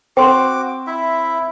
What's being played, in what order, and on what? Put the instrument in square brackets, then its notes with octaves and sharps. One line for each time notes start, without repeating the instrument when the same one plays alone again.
[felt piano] C4 C5 [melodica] F#4 D6 [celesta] G5 C6
[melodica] E4 E5